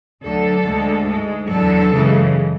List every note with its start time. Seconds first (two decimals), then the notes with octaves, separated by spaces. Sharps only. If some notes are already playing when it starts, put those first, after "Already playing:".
0.23 D2 D3 F#3 A4
0.65 D2 D3 G#3
1.08 G#2 G#3
1.50 E2 D3 F#3 A4
1.92 F#2 C#3 E3 G#3